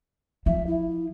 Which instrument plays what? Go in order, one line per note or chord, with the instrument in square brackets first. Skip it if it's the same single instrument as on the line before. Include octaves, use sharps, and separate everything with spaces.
[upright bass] F3 [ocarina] E5
[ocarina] E4